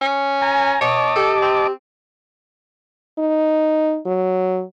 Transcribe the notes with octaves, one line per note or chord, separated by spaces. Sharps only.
C#4
G#5 A#5
B2 C#5 D#5 A5 D6
G4 A4 G5
C4
D#4
F#3